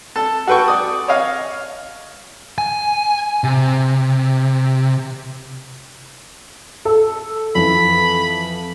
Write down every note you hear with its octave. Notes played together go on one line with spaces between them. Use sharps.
A4 A5
F#4 A4 B4 G5 C#6
D5 D#6
C#5 D#5 F5
G#5
C3
A4
F2 E3 B5